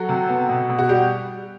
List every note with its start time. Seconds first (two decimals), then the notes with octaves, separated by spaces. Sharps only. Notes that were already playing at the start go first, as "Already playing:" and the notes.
Already playing: F#3 F#4 A4
0.09 C3
0.29 B3
0.49 B2
0.69 B2
0.78 F#4
0.89 G3 G4